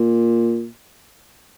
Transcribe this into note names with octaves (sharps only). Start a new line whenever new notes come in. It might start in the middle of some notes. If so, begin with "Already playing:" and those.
Already playing: A#2